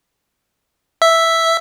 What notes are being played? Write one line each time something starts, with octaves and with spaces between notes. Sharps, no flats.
E5